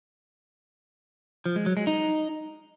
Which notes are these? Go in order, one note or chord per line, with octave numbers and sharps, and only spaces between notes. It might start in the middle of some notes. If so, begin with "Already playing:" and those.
F3
G#3
F#3
G#3
D#4